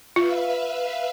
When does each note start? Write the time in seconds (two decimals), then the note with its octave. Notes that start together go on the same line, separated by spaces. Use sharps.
0.16 F4 B4 E5 F5